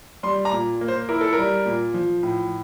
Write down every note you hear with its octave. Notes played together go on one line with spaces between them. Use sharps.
G3 C6
A#5
A#2
A#3
C5
E4 A#4
A4
A#4
G3
A#2
F3
A2